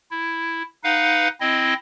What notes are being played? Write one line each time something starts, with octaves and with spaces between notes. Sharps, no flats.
E4
D#4 B4 F5 F#5
C4 E4 D#5